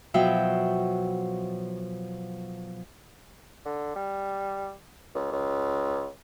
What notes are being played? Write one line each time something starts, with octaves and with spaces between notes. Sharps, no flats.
B2 F3 F#3 E5 G5 G6
D3
G3
C#2
C#2